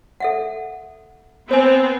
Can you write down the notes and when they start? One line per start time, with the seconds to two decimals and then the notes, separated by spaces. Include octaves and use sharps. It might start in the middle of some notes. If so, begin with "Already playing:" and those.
0.20 A4 E5 F#5
1.51 B3 C4 C5 G#5